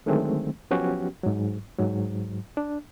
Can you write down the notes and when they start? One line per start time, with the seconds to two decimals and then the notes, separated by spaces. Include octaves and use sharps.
0.06 D3 D#3 F#3 G#3 A3 C4
0.71 F3 F#3 B3 C#4 F#4 G4
1.23 G#2 F#3
1.79 G#2 F#3
2.57 D4